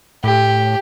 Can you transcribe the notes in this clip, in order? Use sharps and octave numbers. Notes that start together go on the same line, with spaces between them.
A2 G4